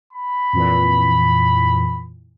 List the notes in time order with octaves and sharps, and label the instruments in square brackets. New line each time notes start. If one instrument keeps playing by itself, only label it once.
[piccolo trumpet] B5
[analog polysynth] F2 A#2 E3